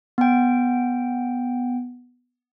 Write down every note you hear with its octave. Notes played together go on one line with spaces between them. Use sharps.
B3 G5